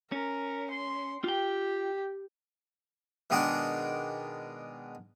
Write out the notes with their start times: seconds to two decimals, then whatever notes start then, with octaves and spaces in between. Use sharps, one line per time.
0.12 C#4 A#4
0.71 C6
1.24 F4 G4 G5
3.30 B2 D#3 G#3 D4 D5 F#5